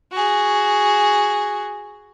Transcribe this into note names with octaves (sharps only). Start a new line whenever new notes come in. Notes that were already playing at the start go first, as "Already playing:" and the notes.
F#4 G#4